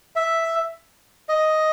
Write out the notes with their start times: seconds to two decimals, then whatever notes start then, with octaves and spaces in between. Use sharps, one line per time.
0.16 E5
1.29 D#5